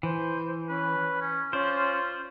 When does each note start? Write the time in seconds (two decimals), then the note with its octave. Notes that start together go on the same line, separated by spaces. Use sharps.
0.03 E3 C5
0.69 C#4 B4
1.21 C#4
1.53 C#4 F4 C5 D5